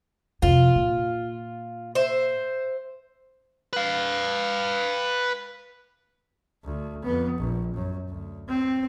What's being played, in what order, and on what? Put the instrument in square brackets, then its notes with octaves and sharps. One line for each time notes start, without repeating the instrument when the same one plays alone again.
[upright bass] F2 C3 [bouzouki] F4
[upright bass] A#2
[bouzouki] C5 E5
[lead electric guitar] B4 F5
[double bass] D2
F2 B3
A#1
F#2
D2
C4